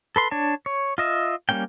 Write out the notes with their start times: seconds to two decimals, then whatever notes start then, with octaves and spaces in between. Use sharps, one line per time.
0.16 A4 B4 C6
0.31 D4 C#5 A5
0.66 C#5
0.98 F4 D#5 E5
1.49 G3 A3 A#3 C#4 G5